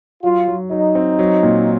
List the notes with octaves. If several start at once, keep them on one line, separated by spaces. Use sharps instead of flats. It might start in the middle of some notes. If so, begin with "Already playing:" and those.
F#3 F4
F#3
F#3 D#4
C4
F#3
A#2